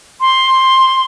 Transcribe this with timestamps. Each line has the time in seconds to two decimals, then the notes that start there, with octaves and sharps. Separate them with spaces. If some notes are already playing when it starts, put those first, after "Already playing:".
0.20 C6